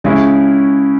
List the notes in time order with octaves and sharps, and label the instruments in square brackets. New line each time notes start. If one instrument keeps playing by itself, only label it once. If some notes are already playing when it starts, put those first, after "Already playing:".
[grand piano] C#3 G#3 C#4 E4